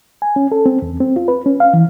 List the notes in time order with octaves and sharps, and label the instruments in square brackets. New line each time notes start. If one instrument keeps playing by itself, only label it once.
[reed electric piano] G#5
C#4
A4
C4
E2
C4
F4
B4
C#4
F5
E3